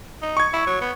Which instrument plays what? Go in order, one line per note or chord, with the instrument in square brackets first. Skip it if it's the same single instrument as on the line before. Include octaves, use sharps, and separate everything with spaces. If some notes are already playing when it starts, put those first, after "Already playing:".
[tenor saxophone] D#4
[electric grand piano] C#6 G#6
[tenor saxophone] E4
F#3
B3